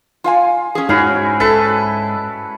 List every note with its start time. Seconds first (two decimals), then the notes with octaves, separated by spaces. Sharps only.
0.24 F4 F5 G#5
0.75 C#4 G#4
0.89 G#2 C#4 D#4 E4 F#4 G#4
1.40 A4 B4 E5 A5